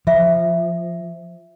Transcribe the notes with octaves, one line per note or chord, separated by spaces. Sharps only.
F3 F4 E5